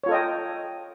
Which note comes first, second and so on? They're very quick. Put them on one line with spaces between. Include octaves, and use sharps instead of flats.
C#5 F4 A4 D#5 G5